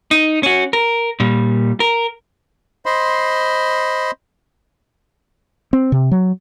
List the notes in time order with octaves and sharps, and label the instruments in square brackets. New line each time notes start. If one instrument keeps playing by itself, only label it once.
[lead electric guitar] D#4
C#4 F#4
A#4
A#2 G3
A#4
[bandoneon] C5 D#5 B5 C6
[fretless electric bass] C4
C3
F#3